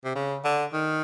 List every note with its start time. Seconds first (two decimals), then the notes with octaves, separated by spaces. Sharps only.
0.05 C3
0.15 C#3
0.45 D3
0.73 D#3